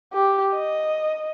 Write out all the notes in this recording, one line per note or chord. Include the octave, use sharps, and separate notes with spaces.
G4
D#5